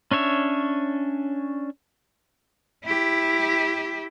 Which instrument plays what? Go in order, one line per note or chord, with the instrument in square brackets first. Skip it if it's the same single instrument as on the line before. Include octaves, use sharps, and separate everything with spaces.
[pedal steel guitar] C#4 D4 C#5 E5
[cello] E4 G4